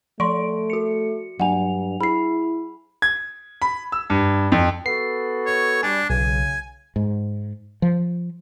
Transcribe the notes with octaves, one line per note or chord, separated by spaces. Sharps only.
F3 A3 D5 C6 C#6 D7
F#4 C#7
G2 F#3 D4 F#5 G#5 F7
E4 G#4 B5 C7
G#6
B5
E6
G2
F2
B3 F#4 A4 C7
C#5
G3 D4 G#5
B1 C#3 G#5
G#2
F3